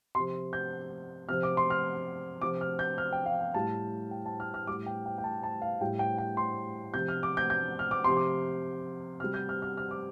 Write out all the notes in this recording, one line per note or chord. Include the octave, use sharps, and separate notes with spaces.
C3 F3 C6
G6
C3 F3 F6
D6
C6
F6
C3 F3 D6
F6
G6
F6
G5
F5
G5
A2 G3 A5
G5
A5
F6
F6
A2 G3 D6
G5
G5
G5
A5
A5
F5
A2 G3 G5
G5
G5
C6
C3 F3 G6
F6
D6
G6
G6
F6
D6
C3 F3 C6
D6
C3 G3 F6
G6
F6
F6
F6
D6